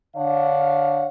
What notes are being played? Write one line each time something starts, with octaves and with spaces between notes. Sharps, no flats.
D3 D4 C#5 F5 F#5